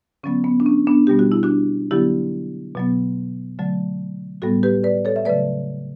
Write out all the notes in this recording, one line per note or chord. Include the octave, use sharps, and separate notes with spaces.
D3 F#3 B3 C#4
B3
D4
C#4
B3 D4
B2 G3 B3 G4
F#4
E4
D4 F#4
D3 F#3 B3 E4 G4
B2 F#3 B3
D3 F#3 A3
A2 G3 B3 F#4 A4
G4 B4
B4 D5
A4 C#5
E5
C#3 F#3 A3 B4 D5